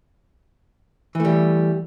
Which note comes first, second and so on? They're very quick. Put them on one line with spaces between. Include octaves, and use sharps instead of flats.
E3 A3 G3